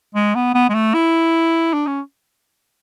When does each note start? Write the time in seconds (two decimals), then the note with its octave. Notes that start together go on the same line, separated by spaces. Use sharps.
0.15 G#3
0.35 B3
0.54 B3
0.70 G#3
0.74 A3
0.94 E4
1.73 D4
1.87 C#4